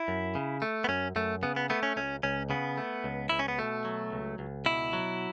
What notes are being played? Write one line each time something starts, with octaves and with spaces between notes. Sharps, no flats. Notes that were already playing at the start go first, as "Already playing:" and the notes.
Already playing: E4
F#2
C#3
A3
B3
F#2 C#4
F#2 A3
C#3 B3
B3
A3 B3
C#4
C#2 C#4
C#2 C#4
C#3 B3
A3
C#2
C#2 E4
C#4
B3
B2 A3
F#3
C#2
C#2
B2 E4
F#3